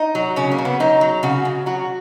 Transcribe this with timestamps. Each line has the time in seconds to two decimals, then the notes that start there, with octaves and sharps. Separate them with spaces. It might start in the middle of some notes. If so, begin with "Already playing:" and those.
Already playing: D#4
0.15 F#3
0.36 C#3 C#4
0.51 A#3
0.58 C#3
0.65 B3
0.80 F#3 D#4
1.01 F#3
1.23 C#3 F#4
1.45 C#3
1.66 F#3 F#4